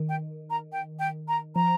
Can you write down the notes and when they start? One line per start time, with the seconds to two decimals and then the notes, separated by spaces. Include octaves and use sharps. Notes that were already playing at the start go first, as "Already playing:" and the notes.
Already playing: D#3
0.09 G5
0.50 A#5
0.72 G5
0.99 G5
1.28 A#5
1.55 F3 A#5